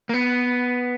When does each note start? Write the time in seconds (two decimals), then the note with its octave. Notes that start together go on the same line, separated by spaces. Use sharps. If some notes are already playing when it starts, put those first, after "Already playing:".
0.09 A#3
0.14 B3